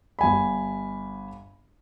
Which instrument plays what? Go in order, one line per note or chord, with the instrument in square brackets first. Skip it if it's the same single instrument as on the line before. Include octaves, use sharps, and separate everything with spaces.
[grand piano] G1 G#5 B5